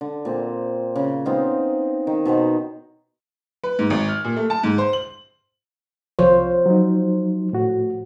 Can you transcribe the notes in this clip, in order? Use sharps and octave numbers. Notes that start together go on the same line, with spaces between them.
D3
A#2 C4
C#3
B3 C4 D#4 F5
D#3
B2 D#3 C5 F#5
B4
G#2
G#1
F6
A#2
A3
A5
G#2
C5
F#7
C2 F3 F4 C5 C#5
F#3 D#4
A2 F#4